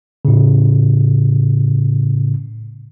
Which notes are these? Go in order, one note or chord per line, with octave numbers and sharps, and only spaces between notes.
A2 C#3